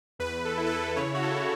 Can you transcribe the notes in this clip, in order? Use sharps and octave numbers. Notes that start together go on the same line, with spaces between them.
E2 B4
A4
E4
A4
B4
C#3 C#5
F#4
A4
E4